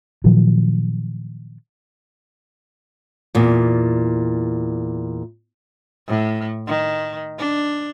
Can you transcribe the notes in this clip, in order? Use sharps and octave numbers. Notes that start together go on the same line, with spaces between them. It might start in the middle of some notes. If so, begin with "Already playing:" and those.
A#2 D#3 F3 F#3
E2 A#2
A2
D#3
D4